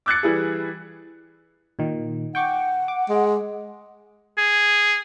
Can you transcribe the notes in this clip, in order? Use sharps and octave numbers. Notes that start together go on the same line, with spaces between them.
D6 E6 F#6 G#6 A6 C#7
E3 G3 E4 G#4
A#2 D#3
F#5 G5 C#6 D6
D6
G#3
G#4